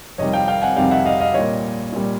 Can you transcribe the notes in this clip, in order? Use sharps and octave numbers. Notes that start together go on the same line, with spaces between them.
F2 C3 D#3 G3 C#5 D#5
F5 G5
F5 G5
F#5 G#5
F2 C3 D#3 G3 F5 G5
E5 F#5
D#5 F5
D#5 F5
A#2 G3 C#5 D#5
A#2 G3